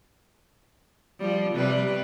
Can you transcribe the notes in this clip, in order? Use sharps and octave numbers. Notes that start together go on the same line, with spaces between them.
F3 G3
C3 G3 B4